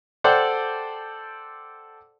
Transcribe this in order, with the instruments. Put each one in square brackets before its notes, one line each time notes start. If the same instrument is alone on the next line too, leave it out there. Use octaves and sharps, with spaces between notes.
[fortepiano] A4 C5 D5 F#5 G5